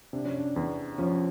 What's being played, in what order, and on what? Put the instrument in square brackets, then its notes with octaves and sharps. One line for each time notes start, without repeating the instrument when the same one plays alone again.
[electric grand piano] C3 [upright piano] D4
[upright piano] C#4
D4
[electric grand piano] E2
[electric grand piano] F3 [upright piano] C#4